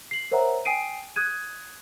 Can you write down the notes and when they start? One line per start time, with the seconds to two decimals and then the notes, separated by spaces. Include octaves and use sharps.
0.11 C7 F#7
0.31 A#4 C5 C#5 E5 F#5 A#5
0.65 G5 G#5 D#6 C7 D7 D#7
1.16 D#6 F#6 G#6 D#7